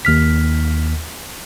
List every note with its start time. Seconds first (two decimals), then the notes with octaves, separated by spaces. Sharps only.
0.05 D#2 F6 B6